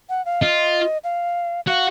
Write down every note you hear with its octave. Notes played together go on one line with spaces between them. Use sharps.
F#5
F5
F4 D#5
F5
F#4 F5